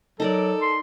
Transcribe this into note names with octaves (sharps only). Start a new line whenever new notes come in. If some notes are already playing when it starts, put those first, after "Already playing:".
F#3 D#4 A4 A#4 D5
C6